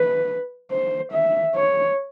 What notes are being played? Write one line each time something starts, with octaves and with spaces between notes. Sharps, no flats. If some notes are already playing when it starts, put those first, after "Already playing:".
Already playing: B4
C5
E5
C#5